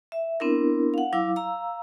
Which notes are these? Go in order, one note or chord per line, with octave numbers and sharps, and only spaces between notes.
E5
B3 C4 D4 E4 A#4
F5 F#5
F#3 E4 F5 D6 E6
F5 A#5 E6